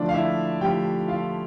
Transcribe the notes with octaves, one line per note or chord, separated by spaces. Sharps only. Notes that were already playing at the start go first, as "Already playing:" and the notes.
Already playing: D3 F3 A3 D4 F4 D5
F5
E4 E5
D3 F3 A3 D4 F4 G4 G5
F4 F5